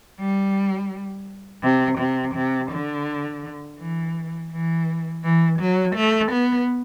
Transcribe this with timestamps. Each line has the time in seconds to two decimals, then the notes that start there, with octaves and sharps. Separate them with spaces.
0.19 G3
1.63 C3
1.99 C3
2.35 C3
2.71 D3
3.79 E3
4.52 E3
5.23 E3
5.60 F#3
5.96 A3
6.32 B3